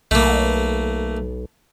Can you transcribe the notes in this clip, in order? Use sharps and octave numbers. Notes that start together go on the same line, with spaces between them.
B1 A3 A#3